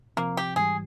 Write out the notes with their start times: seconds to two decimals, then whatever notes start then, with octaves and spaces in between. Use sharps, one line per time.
0.17 C3 F3 A#3 C4
0.37 G4
0.56 G#2 E3 G3 G#4